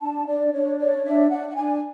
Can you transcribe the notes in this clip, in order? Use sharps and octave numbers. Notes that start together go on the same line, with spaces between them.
D4 A5
D4 D5
D4 C#5
C#5 D5
D4 E5
D4 F#5
F#5
D4 G#5